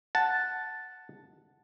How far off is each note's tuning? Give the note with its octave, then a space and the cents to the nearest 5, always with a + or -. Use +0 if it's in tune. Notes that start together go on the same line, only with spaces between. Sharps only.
F#5 +0 A5 +0